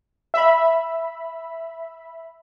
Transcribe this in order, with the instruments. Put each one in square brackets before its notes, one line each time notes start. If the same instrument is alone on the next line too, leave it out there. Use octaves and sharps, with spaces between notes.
[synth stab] E5 B5